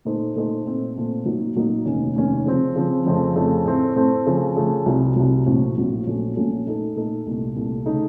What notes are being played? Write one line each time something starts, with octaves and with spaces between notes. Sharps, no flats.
A#2 A3 D#4 A4 C5
A#2 A3 D#4 A4 C5
A#2 A3 C4
A#2 A3 C4
A#2 F#3 A#3 D#4
A#2 F#3 A#3 D#4
F1 D#2 D#3 A#3 C#4
F1 D#2 D#3 A#3 C#4
C#3 F3 C4
C#3 F3 C4
F2 C#3 F3 A3 C4
F2 C#3 F3 A3 C4
A2 A3 C4
A2 A3 C4
C#3 F3 A3
C#3 F3 A3
C2 C3 F#3
C2 C3 F#3
A#1 A2 F#3 C4
A#1 A2 F#3 C4
A#1 A#2 F#3 A3 C#4
A#1 A#2 F#3 A3 C#4
A#2 A3 D#4 A4
A#2 A3 D#4 A4
C2 A#2 A3
C2 A#2 A3
C#3 A3 D#4